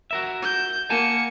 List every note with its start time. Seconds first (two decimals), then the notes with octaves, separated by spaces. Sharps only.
0.11 F#4 A#4 E5
0.42 G6
0.90 A#3 F#5 G#5 A5 C#7